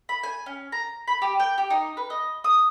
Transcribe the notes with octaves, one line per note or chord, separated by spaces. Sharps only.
B5
G#5
C#4
A#5
B5
G4
G5
G4
D#4
B4
D#5
D#6